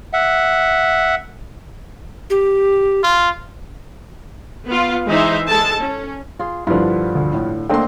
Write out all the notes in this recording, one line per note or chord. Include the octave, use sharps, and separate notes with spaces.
E5 F#5
G4
F4
B3 F4
E3 G#3 D#4 C5 E5
G#3 A4 A5
C#4
F4 G#4
G2 D3 F3 E4 F4 B4
D2
A2
D3 A3 A#3 C4 D#5 G5 C6